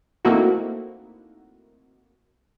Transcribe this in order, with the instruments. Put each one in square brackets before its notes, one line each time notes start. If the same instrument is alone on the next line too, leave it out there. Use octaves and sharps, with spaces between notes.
[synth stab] A3 A#3 C4 D#4 E4 F#4